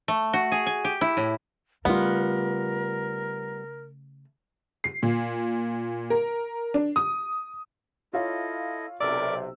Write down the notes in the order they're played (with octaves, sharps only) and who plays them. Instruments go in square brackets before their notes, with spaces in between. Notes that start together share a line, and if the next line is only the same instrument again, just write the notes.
[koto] A3
F#4
G#4
G#5
G4
E4
A2
[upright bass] C#3 A3 [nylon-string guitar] G3 F4 [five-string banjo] B3 [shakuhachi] A#4
[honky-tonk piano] C7
A#2
A#4
D4
D#6
[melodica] E4 A4 D#5 [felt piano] F4 C#5 F5
[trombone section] B1 C3 [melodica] A4 A#4 E5 [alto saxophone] D5 [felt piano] E6